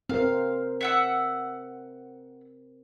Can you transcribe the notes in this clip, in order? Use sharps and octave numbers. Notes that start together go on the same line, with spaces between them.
C4 A#4 C5 F5
E5 F#5 E6